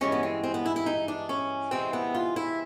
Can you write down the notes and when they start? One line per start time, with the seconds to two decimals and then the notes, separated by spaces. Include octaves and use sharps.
0.01 G2 E3 G#3 C#4
0.12 B3
0.23 C4
0.44 C4
0.54 B3
0.66 E4
0.76 E4
0.86 D#4
1.08 D4
1.29 C#4
1.71 E2 C3 E3 G#3 C4
1.93 B3
2.14 F4
2.36 E4